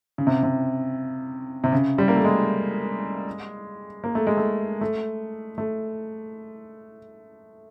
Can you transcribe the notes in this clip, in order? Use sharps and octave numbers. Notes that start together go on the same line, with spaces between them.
C#3
C3
C3
C3
C#3
G3
A#3
A3
G#3
A#3
A3
G#3
A3
A3
A3